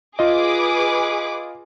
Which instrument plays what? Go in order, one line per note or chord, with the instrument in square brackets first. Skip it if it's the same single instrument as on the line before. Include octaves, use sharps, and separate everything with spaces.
[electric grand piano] F4 D#5 [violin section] G#4 B4 D6